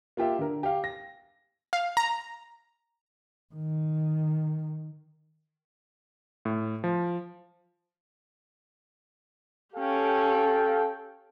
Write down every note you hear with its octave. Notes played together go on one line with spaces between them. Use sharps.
A#3 F4 G4 E5
D3 A#4
G4 F5
A#6
F5
A#5
D#3
A2
F3
C#4 G4 A4 F5 G5